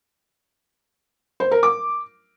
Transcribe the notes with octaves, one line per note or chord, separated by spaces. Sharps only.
C5
A#4
D6